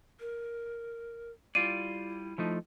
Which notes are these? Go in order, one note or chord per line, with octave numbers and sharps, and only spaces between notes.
A#4
G3 E4 F4 D5 D#7
F3 A3 D#4